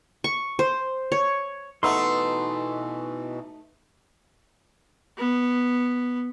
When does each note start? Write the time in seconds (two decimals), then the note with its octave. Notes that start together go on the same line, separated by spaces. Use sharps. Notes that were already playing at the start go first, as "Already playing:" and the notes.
0.24 C#6
0.59 C5
1.12 C#5
1.83 B2 E3 A3 D#4 B4 F#5 C6 E6
5.18 B3